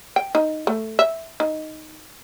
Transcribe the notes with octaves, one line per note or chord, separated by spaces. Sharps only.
G5
D#4
A3
E5
D#4